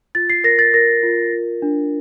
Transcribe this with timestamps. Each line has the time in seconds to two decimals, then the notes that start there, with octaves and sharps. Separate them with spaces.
0.15 F4 A6
0.30 C7
0.44 A#4 A#6
0.59 A6
0.74 A#4 A#6
1.03 F4
1.33 F4
1.62 D4